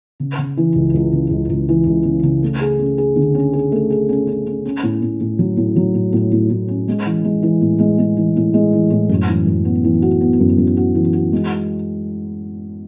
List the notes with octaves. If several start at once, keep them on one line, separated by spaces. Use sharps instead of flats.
C#3
C#3
E3
C#2
C#2
C#3
C#2
C#2
E3
C#2
C#3
C#3
A3
G#4
C#4
G#4
D3
C#4
G#4
A3
G#4
C#4
C#4
C#4
C#4
A2
A2
A2
F#3
A2
F#3
A2
A2
A2
A2
C#4
G#3
E3
G#3
E3
A2
G#3
G#3
E3
A2
G#3
E3
A2
F#2
E3
F#2
B3
E3
F#4
B3
F#2
F#2
F#4
E3
F#4
G#3